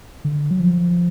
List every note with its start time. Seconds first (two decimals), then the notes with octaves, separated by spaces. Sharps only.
0.25 D3
0.51 F#3
0.60 F3